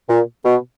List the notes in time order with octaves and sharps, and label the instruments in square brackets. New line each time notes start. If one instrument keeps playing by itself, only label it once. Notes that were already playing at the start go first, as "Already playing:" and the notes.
[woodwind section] A#2
B2